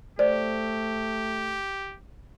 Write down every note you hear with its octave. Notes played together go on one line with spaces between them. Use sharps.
A3 G4 C5 D5